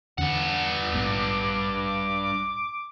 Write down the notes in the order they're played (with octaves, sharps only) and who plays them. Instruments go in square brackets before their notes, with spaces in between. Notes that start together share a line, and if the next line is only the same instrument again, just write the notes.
[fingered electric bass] E2 D3 C#4 [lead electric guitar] G2 F#5
[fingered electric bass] A#1 G#2 B3 [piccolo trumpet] D6